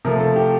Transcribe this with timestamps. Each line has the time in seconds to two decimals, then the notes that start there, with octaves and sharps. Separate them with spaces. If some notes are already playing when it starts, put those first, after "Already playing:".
0.05 C3 F3 A3 A#4
0.20 A4
0.36 G4